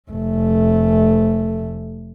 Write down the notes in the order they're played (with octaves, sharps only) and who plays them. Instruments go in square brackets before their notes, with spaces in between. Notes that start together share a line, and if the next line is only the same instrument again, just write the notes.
[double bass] F1 A3